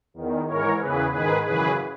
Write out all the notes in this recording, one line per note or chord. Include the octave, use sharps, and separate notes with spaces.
E2 D#3
G#2 E3 A#4 C#5
E2 C#3 E3 G#4 B4
G#2 D#3 G#4 B4
F#2 C#3 E3 G#4 B4